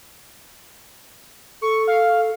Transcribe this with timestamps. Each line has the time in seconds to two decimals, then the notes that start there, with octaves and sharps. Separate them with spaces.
1.62 A4 C#6
1.88 F5